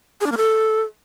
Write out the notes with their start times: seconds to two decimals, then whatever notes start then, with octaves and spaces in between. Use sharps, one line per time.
0.21 G#4
0.26 D4
0.32 A#3
0.37 A4